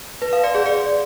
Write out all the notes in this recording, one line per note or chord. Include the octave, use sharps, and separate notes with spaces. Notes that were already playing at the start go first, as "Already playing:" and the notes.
B4
F5
D5
G#4
D5